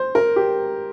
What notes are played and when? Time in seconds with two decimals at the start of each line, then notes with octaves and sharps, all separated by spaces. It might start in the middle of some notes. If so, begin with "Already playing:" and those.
Already playing: C5
0.15 A#4
0.36 G4